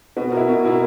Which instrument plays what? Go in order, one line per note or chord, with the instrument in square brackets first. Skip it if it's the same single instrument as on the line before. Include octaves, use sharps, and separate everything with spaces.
[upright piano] B2 [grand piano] B3
[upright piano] A#3 E4
B2
A#3 E4